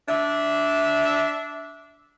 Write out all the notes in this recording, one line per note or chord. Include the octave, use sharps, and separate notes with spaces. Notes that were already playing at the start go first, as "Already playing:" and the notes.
D4 E5